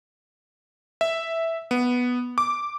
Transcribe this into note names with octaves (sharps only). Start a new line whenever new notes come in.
E5
B3
D6